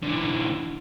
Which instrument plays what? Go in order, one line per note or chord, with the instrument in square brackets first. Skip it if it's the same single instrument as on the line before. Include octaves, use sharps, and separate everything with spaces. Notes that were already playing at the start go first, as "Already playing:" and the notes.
[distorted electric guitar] D3 E3